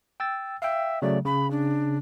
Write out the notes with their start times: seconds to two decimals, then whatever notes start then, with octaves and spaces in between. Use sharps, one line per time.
0.20 G5 E6 A6
0.62 E5 F5 G5
1.02 C#3 F#3 A3 D5
1.25 C#3 B5
1.51 D4